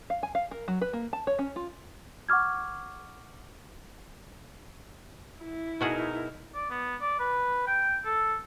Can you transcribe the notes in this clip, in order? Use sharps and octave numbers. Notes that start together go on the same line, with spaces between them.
F5
G#5
F5
A#4
F#3
B4
A#3
A5
C#5
C#4
F4
F#5 C#6 D6 F6 G#6
E4
B2 D#4 F#4 G#4 A#4
D5
B3
D5
B4
G5
A4